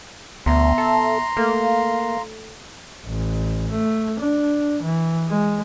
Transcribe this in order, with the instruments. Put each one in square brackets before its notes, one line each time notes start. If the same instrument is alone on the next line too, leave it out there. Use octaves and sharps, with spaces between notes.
[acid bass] D2 [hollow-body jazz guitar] B2 [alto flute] E5 [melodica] A#5 C6
[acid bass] A4
[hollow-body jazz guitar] A3 [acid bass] A#3 [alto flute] F5
[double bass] A1
A3
D4
E3
G#3